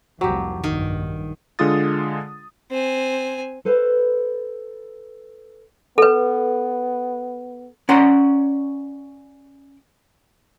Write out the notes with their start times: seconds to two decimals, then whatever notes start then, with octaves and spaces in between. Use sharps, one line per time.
0.21 F1 C2 F3 F#3 G4
0.64 A#1 G2 D#3
1.59 D3 G#3 D4 F4 D#6 A6
2.71 C4 G#5
3.65 A4 B4 C5 F5
5.98 B3 A4 B4
7.89 C#4 D5 F#5 A#5 C6